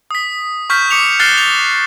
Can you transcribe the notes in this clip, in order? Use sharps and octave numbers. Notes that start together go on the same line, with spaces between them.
D#6 B6
C#6 F6 G6 B6
D6 C#7 F7
F6 F#6 A6 C7 G7
A6 F7